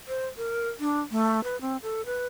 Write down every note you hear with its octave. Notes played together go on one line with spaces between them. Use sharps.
C5
A#4
D4
A3
B4
C4
A4
B4